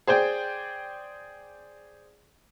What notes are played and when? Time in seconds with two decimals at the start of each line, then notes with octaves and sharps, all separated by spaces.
0.07 G#4 C5 D5 G5